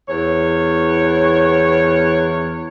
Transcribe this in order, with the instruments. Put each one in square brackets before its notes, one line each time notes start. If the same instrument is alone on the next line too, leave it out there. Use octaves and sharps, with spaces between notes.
[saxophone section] E2 C#5